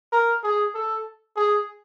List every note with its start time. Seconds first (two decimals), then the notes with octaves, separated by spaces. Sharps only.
0.12 A#4
0.43 G#4
0.74 A4
1.36 G#4